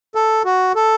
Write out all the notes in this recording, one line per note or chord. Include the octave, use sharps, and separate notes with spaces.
A4
F#4
A4